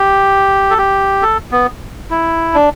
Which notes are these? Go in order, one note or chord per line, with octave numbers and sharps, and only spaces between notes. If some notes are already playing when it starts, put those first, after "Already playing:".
Already playing: G4
A4
G4
A4
B3
E4
D4